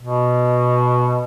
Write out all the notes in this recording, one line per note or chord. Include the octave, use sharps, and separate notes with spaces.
B2